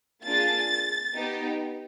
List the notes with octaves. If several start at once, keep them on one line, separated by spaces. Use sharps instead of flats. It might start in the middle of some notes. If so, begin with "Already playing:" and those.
A#3 D4 F4 G#4 A6
B3 D#4 G4